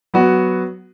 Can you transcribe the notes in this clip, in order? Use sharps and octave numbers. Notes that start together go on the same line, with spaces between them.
F#3 B3 F#4